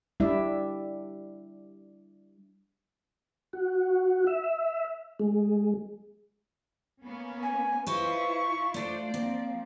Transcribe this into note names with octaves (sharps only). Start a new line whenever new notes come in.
G3 D4 E4 D5 E5
F#4
E5
G#3
A#3 B3 C#4
G#5
E4 F4 B4 C5 D#5 C#6
A3 D4 F4 C5 D5
F3 A#3 C4